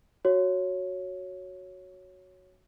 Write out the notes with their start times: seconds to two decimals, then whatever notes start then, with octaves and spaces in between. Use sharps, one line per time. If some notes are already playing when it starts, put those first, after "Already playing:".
0.25 F#4 C#5